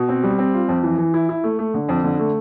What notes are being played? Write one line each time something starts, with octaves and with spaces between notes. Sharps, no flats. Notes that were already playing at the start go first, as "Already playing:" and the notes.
Already playing: B2
C4
G3
C4
F4
F2
E3
E3
E4
E4
A3
A3
D3
F2
D3
A3